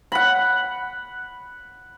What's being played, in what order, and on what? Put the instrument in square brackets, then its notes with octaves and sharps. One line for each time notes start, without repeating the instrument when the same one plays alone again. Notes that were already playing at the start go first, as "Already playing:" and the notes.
[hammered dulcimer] F#5 B5